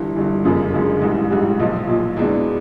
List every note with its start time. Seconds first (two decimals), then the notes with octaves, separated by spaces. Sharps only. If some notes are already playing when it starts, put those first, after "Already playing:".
Already playing: G1 G2 E3
0.16 G1 G2 E3
0.44 G1 F#2 C#3 F3 G#3
0.73 G1 F#2 C#3 F3 G#3
1.02 A#1 G#2 E3 G3
1.30 A#1 G#2 E3 G3
1.60 B1 A#2 F3
1.87 B1 A#2 F3
2.17 E2 B2 G#3 B3 D4